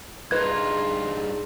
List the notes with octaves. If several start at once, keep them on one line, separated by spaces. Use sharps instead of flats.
G2 D#4 F4 G#4 B4 D#5 G#6